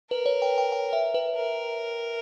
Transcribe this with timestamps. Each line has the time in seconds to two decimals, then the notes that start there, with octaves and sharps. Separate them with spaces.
0.11 A#4 B4
0.26 C#5
0.42 G5
0.58 G5
0.72 G5
0.93 E5
1.14 B4
1.35 A#4